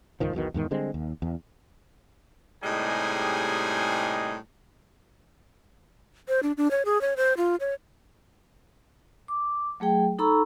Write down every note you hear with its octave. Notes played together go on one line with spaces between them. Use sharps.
C#2 G#2 D#3 F3
B1 E2 B2 D#3
E2 G#2 D#3
D3 G3 G#3 C4
D#2
E2
A2 C3 G3 G#3 D#4 G#4
C5
D4
D4
C#5
G#4
C#5
C5
F4
C#5
D6
F#3 A3 G#4 G5
D#4 A4 A#5 B5 C#6 E6